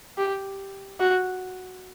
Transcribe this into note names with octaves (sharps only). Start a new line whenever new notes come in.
G4
F#4